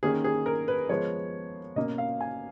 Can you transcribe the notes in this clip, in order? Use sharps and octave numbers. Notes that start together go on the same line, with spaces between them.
D#3 A#3 C#4 G#4
G#4
A#4
B4
F3 G#3 B3 C#5
B2 A#3 C#4 D#5
F5
G#5